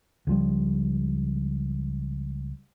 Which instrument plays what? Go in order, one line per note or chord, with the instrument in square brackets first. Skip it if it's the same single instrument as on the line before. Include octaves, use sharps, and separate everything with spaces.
[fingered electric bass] C#2 F3 G3